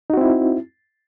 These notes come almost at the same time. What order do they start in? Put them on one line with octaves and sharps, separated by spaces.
D#4 F#4 C4 E4